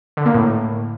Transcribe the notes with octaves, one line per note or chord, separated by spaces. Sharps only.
D3
A#3
A2